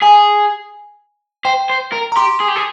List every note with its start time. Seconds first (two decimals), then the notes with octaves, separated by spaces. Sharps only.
0.02 G#4 G#5
1.45 C5 G5
1.70 C5
1.92 A#4
2.12 A#5
2.16 G4 C6
2.40 G#4
2.48 G4
2.56 G#4